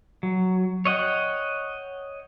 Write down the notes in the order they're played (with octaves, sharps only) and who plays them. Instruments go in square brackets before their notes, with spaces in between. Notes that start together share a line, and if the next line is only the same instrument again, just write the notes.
[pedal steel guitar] F#3
C#5 D#5 F#5 G5